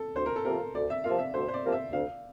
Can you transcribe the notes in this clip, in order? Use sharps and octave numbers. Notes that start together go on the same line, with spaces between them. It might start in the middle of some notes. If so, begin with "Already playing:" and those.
Already playing: A4
D2 C5
A#4
A4
C3 F3 A#3 F4 A#4
D2 D5
E5
C3 F3 A#3 F4 F5
E5
D2 C5
C5
D5
C3 F3 A#3 F4
E5
D2 F5